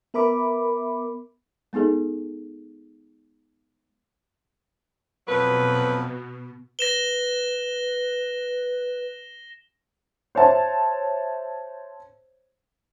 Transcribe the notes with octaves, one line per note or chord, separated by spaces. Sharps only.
B3 A#4 E5 B5 D6
G#3 B3 D#4 G#4 A4
F2 B2 F#3 B4
B4 A#6 E7 G7
C5 C#5 E5 A5